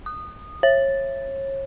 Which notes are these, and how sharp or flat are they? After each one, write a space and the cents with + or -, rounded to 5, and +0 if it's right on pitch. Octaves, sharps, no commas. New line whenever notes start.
D#6 -20
C#5 -30